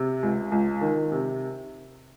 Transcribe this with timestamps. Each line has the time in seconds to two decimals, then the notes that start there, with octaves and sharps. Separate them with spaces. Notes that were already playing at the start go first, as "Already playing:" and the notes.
Already playing: C3
0.23 C#2
0.52 C#2
0.81 D#3
1.12 C3